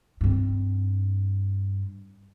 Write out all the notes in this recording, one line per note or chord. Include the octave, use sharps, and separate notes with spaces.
G2 C4